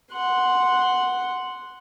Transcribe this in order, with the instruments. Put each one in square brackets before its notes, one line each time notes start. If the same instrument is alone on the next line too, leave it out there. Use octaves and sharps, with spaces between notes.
[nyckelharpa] F#5 C6